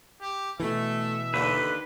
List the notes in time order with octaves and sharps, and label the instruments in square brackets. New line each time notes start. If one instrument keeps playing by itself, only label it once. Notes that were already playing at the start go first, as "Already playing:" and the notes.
[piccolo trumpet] G4
[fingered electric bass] B2 E3 [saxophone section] A3 [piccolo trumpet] E5
[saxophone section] D#2 D3 [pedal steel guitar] B4